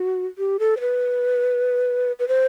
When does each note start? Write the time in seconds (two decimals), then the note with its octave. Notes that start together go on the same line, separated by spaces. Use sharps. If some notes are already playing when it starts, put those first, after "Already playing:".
Already playing: F#4
0.38 G4
0.59 A4
0.77 C5
0.80 B4
2.19 B4
2.28 C5